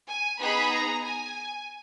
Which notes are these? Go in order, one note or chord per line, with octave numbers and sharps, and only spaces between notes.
G#5
B3 D#4 G#4 B5
A#5
G#5